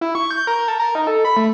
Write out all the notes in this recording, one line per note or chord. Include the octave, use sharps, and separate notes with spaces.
E4
C#6
G6
A#4
A4
A#4
D#4
A4
B5
A3